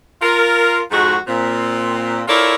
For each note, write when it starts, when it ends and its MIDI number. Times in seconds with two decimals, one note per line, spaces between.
0.22 0.81 65
0.22 0.81 70
0.91 1.16 41
0.91 1.16 44
0.91 1.16 56
0.91 1.16 66
1.27 2.22 46
1.27 2.22 60
2.28 2.55 64
2.28 2.55 65
2.28 2.55 69
2.28 2.55 70
2.28 2.55 73
2.28 2.55 74